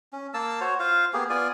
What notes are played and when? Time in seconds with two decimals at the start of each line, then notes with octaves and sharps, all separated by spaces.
0.13 C#4
0.34 A#3 A5 E6
0.60 F#4 C5 C#5
0.80 F4 C5 F5
1.13 A#3 B3 G4 G#4
1.30 B3 F4 D5 G#5